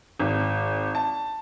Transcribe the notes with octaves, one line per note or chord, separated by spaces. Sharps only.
G#1
A5